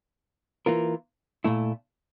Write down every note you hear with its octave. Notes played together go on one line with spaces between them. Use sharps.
E3 A#3 F4 A#4
A#2 A3 E4